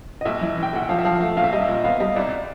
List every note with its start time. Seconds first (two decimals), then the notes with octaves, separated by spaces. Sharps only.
0.21 D#5
0.25 A#1 E5
0.41 E3
0.57 E3
0.63 G5
0.73 A#1 F#5
0.89 F3 F5
0.99 E5
1.05 F3 F5
1.20 A3 F5
1.37 A#1 F5
1.44 E5
1.52 G3 D#5
1.61 E5
1.68 A#2
1.84 B3 F5
2.00 G3 D#5
2.15 C2 D5